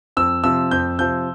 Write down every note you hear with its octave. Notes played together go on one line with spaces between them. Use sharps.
F2 E6
C3 F3 E6
F2 G6
C3 F3 G6